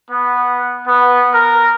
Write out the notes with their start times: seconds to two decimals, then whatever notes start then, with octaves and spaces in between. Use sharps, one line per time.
0.11 B3
0.88 B3
1.34 A#4